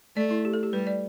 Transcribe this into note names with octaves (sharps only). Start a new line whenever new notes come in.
A3 D5
E4
G4
A4
G4
G3 B4
D5